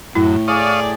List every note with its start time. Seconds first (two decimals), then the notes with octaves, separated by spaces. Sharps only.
0.15 F#2 A2 E4
0.48 G#4 C#5 D5 F5 D#6